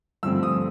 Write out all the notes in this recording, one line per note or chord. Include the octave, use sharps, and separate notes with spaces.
G2 D3 F3 A3 C4 E6
D#6